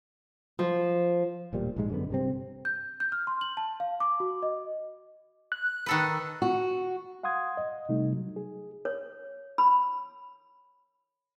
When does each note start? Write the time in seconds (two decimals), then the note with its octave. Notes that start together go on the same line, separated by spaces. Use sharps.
0.59 F3
1.53 E1 A#2 G3
1.76 A#1 G#2 G#3
1.90 F#2 D3 B3
2.10 G2 C3 C4
2.65 G6
3.00 G6
3.12 F6
3.27 C6
3.41 F#7
3.57 A5
3.80 F5
4.00 D6
4.20 F#4
4.43 D#5
5.52 F#6
5.86 D#3 A4 B4
6.42 F#4
7.23 F5 F#5 C6 D#6 G#6
7.57 D#5
7.89 C3 G3 A3 D#4
8.13 F#3
8.36 G#4
8.85 C#5
9.58 B5